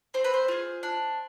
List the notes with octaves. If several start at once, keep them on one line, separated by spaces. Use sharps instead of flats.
C4 C5
B4
C5
F4 G#4
D4